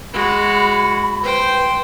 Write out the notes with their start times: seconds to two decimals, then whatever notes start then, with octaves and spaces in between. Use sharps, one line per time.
0.13 G#3 F#4 B5
1.23 B4 C5 G5